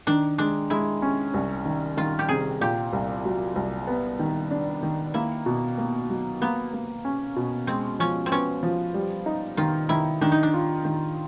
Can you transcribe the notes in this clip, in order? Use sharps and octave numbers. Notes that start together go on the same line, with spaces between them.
D#3 D4
G#3 D4
G#3 E4
C#4
C2
D#3
D#3 F4
G4
C3 G#4
A#2 G4
C2
F#3
C2
B3
D#3
D4
D#3
A#3 E4
B2
A#3
F#3
A#3 B3
A#3
C#4
B2
G#3 C4
F3 C#4
C4
B3 C#4
F3
G3
D#4
D#3 F4
D#3 E4
D#3 D4
D#4
D4
F4
D#3